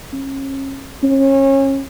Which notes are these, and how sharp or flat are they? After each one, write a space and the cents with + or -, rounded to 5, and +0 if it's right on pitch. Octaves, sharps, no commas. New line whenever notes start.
C#4 -30
C#4 -30